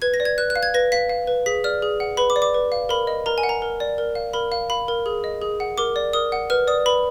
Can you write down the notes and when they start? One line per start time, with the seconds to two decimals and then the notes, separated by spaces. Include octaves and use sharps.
0.02 B4 G#6
0.14 A#6
0.20 D5
0.25 G#6
0.38 B4 F#6
0.50 F#6
0.56 F5
0.63 G#6
0.74 B4 A#6
0.92 F5 B6
1.09 F5
1.27 B4
1.46 G#4 B6
1.64 D5 F6
1.82 G#4
2.00 F#5
2.17 B4 B5
2.30 D6
2.36 D5
2.42 D6
2.54 B4
2.72 F5
2.89 A#4 B5
3.07 D#5
3.26 A#4 A#5
3.38 G#5
3.43 F#5
3.49 A#5
3.62 A#4
3.80 D5
3.98 A#4
4.15 F5
4.33 A#4 B5
4.52 F5
4.70 F5 B5
4.88 A#4
5.06 G#4
5.24 D#5
5.42 G#4
5.60 F#5
5.78 A#4 D6
5.96 D5
6.13 A#4 D#6
6.32 F#5
6.50 B4 F6
6.67 D5 D#6
6.86 B4 B5